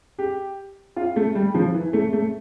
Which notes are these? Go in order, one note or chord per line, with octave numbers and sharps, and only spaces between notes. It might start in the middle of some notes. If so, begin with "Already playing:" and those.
G4
F4
A3
G3
F3
E3
A3
A3